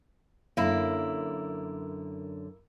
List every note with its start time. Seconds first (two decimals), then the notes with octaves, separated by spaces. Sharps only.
0.57 F#2 D3 A#3 E4